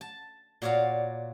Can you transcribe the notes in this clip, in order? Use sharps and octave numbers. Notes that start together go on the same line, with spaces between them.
A5
A#2 F#4 C#5 D5 F5 A#5